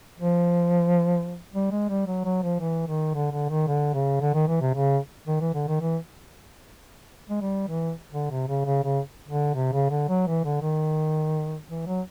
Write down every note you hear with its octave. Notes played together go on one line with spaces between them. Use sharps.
F3
G3
G#3
G3
F#3
F#3
F3
E3
D#3
D3
D3
D#3
D3
C#3
D3
D#3
E3
C3
C#3
D#3
E3
D3
D#3
E3
G#3
G3
E3
D3
C3
C#3
C#3
C#3
D3
C3
C#3
D3
F#3
E3
D3
D#3
E3
F#3